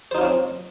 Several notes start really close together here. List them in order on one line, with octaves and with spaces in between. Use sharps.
C5 D#4 F4 C#4 C4